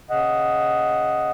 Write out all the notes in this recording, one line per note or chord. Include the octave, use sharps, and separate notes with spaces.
C#3 D#5 F#5